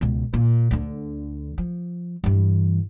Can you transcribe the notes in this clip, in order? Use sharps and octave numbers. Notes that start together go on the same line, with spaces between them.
C#2 B2
A#2
D2 D3
F3
G2 E3